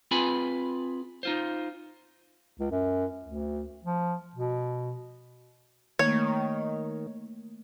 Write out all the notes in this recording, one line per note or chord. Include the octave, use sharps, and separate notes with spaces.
C4 F4 G#4 B4 G#5 B5
D#4 F4 C5
C#2
F#2
D2
F3
B2
D#3 A3 A#3 C#5